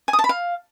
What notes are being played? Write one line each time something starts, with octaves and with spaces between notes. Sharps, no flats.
G#5
D#6
A5
B5
F5